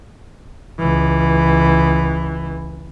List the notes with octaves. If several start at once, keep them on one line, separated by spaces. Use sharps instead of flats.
C#2 E3